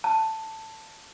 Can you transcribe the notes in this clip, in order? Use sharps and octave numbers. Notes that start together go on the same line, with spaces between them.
A5